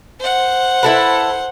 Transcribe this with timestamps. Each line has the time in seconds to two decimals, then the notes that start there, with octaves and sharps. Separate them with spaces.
0.20 C5 F#5
0.83 E4 A4 B4